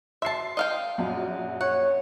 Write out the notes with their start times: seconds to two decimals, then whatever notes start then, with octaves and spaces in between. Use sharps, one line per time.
0.22 E5 A5 C6 C7
0.57 D#5 F5 G5
0.98 A#1 F#2 F#5
1.61 C#5 F#5